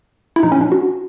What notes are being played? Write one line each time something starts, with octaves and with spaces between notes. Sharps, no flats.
E4
A#2 F3 D#4
C#4
D4
F#4